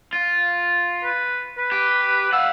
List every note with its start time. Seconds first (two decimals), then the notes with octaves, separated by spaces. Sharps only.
0.13 F4
1.03 B4
1.58 B4
1.72 G4
2.33 F5 F#5 E6